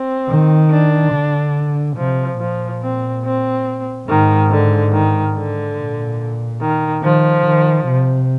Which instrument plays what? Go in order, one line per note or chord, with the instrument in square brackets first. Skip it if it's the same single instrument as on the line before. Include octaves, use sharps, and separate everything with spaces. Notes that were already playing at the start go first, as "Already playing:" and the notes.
Already playing: [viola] C4
[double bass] D#3
[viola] D4
[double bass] D3
[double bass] C3 [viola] F3
[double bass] A#2 [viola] F3
[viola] C4
C4
[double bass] G#2 [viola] D#3
[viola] D3
D#3
D3
[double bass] A#2
[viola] D#3
[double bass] D#3 [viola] F3
[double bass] D#3
C3